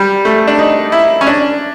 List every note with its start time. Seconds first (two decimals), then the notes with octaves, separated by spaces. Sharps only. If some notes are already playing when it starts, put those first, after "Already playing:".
Already playing: G3
0.25 A3
0.47 D4
0.59 D#4
0.92 E4
1.21 C#4
1.27 D4